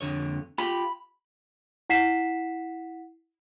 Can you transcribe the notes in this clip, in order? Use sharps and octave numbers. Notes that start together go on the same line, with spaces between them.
F2 D3 C#5
F4 G4 B5
E4 F#5 B6 C7 E7